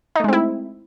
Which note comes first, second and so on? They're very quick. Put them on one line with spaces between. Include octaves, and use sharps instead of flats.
D#4 A3 G#3 C4 E4